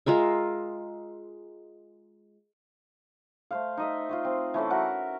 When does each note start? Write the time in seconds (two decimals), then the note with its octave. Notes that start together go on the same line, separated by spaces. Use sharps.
0.06 G#3 F4 A#4 E5
3.51 A3 C5 F5
3.77 D#4 D#5 E5
4.09 F4 C6 C#6
4.25 C4
4.54 E3 A3 C#4 A4
4.70 F#4 A#4 E5 F#5